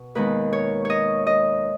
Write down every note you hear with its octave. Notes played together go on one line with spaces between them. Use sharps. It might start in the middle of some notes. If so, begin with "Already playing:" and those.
Already playing: B2
D#2 D#3 G#3 B3 B4
C#5
C#5 D#5
D#5